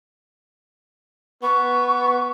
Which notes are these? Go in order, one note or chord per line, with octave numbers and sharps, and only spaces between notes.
B3 C#6